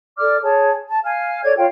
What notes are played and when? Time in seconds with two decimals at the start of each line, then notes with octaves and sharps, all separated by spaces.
0.18 A4 D5 D6 F6
0.42 G#4 C#5 A5
0.88 A5
1.04 F5 G#5 F6
1.43 A4 C#5 D5 G#6
1.57 F4 C#5 F5 G5